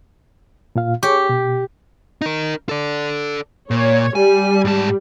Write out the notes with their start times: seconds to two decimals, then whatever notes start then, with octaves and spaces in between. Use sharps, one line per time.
0.75 A#2 F4 F5
1.03 G4 G#4 C#5 C#6
1.29 B2
2.21 D#4 A#4
2.69 A4 D5
3.71 A#2 C#5
4.15 G3 G#5
4.65 G#2 A5